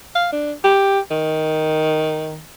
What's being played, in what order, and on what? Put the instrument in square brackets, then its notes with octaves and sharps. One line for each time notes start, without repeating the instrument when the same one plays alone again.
[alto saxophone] F5
D4
G4
D#3